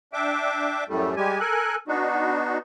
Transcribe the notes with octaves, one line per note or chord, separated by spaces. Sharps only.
D4 E5 G5 D6
F#2 A2 G3 A3
G3 G#3 G4 G#5
A4 A#4 G#5 F#6
B3 D4 D#4 F#4